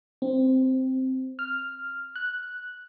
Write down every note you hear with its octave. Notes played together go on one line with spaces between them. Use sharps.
C4
F6
F#6